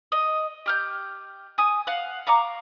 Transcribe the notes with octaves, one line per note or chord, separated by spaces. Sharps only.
D#5
G4 F6 G6
G#5 D#6
F5 F#5
F5 A#5 C#6 D6